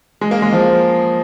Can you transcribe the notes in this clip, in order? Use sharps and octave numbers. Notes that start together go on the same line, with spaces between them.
G#3
A#3
G#3
F3